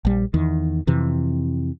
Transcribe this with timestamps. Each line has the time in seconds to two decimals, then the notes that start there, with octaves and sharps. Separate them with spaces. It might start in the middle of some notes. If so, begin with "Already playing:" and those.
0.05 A#1 G3
0.34 E2 D#3
0.87 F2 C3 E3